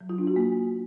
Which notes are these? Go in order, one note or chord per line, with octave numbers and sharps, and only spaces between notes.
F#3
F4
D4
F#4
A#3